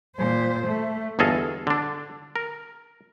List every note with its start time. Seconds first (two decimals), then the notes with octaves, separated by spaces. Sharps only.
0.17 A#2 C5
0.67 A3
1.19 G1 E2 G#4 A4 D#5 F5
1.67 D3 D4
2.36 A#4